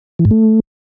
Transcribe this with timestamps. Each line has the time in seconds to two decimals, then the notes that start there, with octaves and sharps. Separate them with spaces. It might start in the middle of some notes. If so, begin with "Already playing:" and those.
0.19 E3
0.25 G#2
0.31 A3